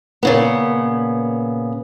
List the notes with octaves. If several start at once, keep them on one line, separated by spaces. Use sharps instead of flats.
A#2 C#3 B3